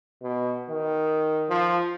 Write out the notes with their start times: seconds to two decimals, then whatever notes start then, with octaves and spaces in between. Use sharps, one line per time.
0.23 B2
0.70 D#3
1.49 F3